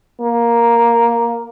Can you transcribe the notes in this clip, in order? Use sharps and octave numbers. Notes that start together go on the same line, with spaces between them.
A#3